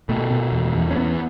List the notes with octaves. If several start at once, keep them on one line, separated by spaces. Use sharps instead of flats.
B2 A3
B2
E2
E2
C#4
E2 B3